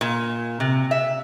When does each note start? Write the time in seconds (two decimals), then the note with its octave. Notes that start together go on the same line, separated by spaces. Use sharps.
0.01 A#2
0.60 C3
0.91 E5